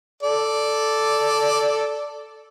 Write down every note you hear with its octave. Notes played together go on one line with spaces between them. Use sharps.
A4 D5